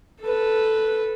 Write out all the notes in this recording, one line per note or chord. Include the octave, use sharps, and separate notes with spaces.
A4 B4